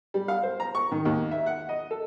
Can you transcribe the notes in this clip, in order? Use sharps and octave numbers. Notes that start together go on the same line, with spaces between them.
G3
F5
C5
A#5
C#6
D#3
D#2
E5
F#5
D#5
A4